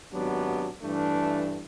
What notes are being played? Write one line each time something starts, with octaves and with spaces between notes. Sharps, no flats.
G#1 F#3 B3 D4 G4
G2 E3 A3 D4